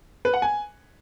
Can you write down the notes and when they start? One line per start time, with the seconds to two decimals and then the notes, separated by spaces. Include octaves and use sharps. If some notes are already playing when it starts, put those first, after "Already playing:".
0.25 B4
0.34 F#5
0.42 G#5